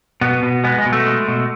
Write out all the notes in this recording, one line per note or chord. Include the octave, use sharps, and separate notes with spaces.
B2 B3
B2
G#3 B3
G#3
B2
A3
G#3
B2